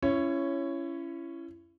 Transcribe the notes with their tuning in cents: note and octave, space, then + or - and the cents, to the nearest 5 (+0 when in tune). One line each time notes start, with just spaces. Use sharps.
C#4 +0 E4 +30 C#5 -5